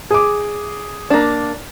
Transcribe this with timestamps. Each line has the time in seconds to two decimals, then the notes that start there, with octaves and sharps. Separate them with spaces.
0.11 G#4 D6
1.10 A#3 D4